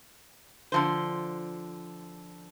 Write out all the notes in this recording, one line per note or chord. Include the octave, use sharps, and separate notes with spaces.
D3 F3 C5